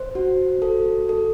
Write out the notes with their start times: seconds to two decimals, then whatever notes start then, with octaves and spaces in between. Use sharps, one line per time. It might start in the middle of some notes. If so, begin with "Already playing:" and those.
Already playing: C5
0.15 F#4
0.62 A4
1.09 A4